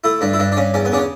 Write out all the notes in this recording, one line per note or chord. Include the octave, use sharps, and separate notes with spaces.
A3 E4
G2 D4
E4
G2 D4
D4
G2 C#4
E2 C#4
B3
C#3 D4
C#4